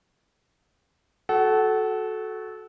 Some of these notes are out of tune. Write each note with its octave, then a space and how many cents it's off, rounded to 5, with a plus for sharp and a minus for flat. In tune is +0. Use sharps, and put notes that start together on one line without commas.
F#4 -10 A4 -20 F#5 +25